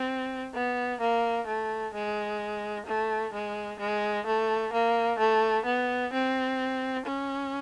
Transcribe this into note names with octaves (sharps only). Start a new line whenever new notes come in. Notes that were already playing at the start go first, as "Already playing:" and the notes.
Already playing: C4
B3
A#3
A3
G#3
A3
G#3
G#3
A3
A#3
A3
B3
C4
C#4